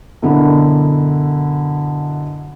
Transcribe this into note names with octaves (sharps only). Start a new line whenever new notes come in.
F#2 B2 D3 D4 E4